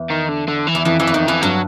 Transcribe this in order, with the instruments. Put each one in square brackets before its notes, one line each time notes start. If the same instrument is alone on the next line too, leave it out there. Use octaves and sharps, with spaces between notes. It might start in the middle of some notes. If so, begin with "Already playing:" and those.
Already playing: [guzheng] E2
[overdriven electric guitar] D#3
D3
D3
E3
[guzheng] E2
[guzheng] F2 [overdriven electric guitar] E3
[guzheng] F2 [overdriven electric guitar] E3
[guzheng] E2
[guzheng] F2 [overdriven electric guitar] D#3
[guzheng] F2 [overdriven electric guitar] E3
[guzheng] G2 [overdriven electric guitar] F#3